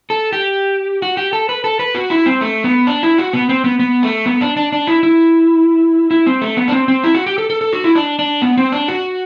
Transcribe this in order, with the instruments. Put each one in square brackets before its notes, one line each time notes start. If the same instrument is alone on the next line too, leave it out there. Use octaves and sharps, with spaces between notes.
[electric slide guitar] A4
G4
F#4
G4
A4
B4
A4
B4
F#4
E4
C4
A3
B3
D4
E4
F#4
B3
C4
B3
B3
A3
B3
D4
D4
D4
E4
E4
E4
C4
A3
B3
D4
C4
C4
E4
F#4
G4
A4
A4
A4
F#4
E4
D4
D4
B3
C4
D4
F#4